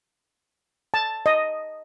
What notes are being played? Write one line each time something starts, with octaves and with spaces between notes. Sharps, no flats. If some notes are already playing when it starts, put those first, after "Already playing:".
A5
D#5